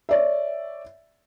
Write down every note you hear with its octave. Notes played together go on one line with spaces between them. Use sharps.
C#5 D5 E5